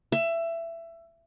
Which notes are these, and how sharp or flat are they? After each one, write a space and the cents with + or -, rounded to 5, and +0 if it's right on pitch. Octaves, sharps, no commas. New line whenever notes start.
E5 +20